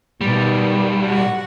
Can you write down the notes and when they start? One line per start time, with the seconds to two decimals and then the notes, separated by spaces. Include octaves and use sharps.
0.21 B1 B2 D#3 G3
1.05 F#4 F#5